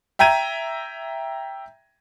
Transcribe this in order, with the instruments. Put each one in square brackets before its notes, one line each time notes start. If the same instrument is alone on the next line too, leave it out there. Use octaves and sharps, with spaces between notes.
[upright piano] E5 G5 A#5 G#6 D#7